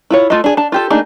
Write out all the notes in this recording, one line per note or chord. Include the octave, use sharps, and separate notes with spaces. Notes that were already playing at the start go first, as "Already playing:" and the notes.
E4 F4 C#5
A3 F4 G#4 A4 D#5
D4 G#4
D4 A5
F4 G4 A4
A3 A#3 D4 D#4 G#4